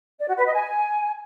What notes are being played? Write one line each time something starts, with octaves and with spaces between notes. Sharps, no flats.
D5
F#4
B4
D#5
G#5